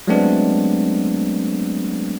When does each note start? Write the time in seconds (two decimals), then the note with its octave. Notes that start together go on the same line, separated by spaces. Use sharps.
0.07 F#3 G#3 A3 B3 C4 D4